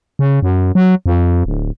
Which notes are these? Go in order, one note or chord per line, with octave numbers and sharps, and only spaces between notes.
C#3
F#2
F#3
F2
D1